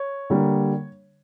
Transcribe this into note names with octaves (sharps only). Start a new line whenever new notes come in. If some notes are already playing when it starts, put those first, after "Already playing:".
Already playing: C#5
D3 G3 A#3